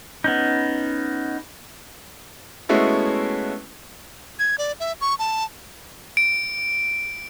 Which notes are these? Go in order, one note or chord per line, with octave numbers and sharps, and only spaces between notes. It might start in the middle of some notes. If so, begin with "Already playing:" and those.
B3 C#4 D#4
G#3 A3 B3 C#4 E4 F#4
G#6
D5
E5
C#6
A5
D7